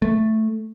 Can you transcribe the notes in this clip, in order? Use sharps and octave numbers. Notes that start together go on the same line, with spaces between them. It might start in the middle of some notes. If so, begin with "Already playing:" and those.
A3